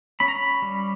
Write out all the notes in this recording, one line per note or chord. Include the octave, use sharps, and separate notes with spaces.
C#4 B5
A#5
B5
G3